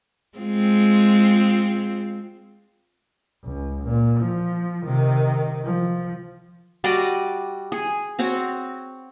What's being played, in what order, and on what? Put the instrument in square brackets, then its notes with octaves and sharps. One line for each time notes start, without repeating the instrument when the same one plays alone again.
[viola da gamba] G#3 C4 F4
[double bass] C#2
A#2
F3
C3 D#3
F3
[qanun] G3 F#4 D5 D#5
G#4
C4 F#4 C#5